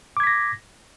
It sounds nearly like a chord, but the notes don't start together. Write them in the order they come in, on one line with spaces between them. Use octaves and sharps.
D6 G#6 B6 A#6